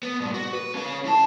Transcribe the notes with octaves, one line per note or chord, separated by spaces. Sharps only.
B3
G2 A#2
F#4
B4
C#4 F5
E4 A5